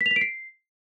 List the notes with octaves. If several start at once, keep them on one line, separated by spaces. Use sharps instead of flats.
B6
F7
B6
D7
C7